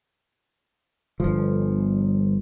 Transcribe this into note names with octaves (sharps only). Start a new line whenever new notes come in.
G1 F3